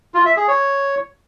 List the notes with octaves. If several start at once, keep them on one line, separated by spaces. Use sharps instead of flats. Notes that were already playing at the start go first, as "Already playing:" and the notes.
F4
E5
G#4
C#5